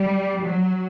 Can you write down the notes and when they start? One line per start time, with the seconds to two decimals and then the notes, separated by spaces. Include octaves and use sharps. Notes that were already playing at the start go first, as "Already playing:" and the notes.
Already playing: G3
0.41 F#3